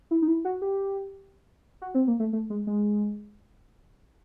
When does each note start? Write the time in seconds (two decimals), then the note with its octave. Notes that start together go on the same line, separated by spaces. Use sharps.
0.11 E4
0.22 D#4
0.28 E4
0.45 F#4
0.62 G4
1.82 F#4
1.95 C4
2.08 A#3
2.20 A3
2.33 A3
2.50 G#3
2.67 G#3